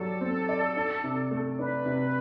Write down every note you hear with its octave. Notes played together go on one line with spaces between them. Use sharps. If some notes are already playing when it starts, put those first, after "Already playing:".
Already playing: F#3 G4 A4 D5
C4
D5
D4
C3
A3
D4 B4
C3